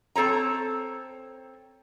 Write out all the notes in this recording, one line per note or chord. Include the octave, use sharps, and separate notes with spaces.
C4 A4 C#5 A#5